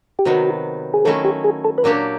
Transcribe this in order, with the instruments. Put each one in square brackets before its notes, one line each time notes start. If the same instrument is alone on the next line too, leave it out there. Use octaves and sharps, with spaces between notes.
[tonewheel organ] G4
[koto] C3 D#3 F#3 B3 [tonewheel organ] F#4
[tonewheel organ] G#4
[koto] D#3 F#3 A3 C#4 E4 [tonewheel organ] A4
[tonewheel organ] G4
G#4
A4
B4
[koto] A#2 F#3 A#3 D4 G4 [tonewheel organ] A#4